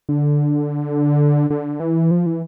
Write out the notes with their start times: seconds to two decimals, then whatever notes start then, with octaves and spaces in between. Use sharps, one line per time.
0.09 D3
1.50 D3
1.80 E3
2.11 F3
2.26 E3